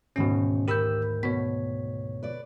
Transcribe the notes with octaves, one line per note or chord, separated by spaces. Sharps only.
D2 G#2 B2 D#3 C#4
G4 A#4 B5 E6 G6
B2 B3 C#5 B6
B4 D5